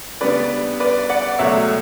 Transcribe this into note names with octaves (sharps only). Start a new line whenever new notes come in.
C#3 G3 B3 D4 B4 D5
B4 D5
D5 F#5
C#2 B2 F#3 A3 C#5 E5